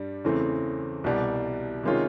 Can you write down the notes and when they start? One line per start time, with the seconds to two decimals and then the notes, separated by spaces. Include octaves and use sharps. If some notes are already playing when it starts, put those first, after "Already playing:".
Already playing: G2 G3
0.24 E2 C#3 E3 A3 C4
1.04 C2 B2 G3
1.83 C3 D#3 G#3 C#4 F4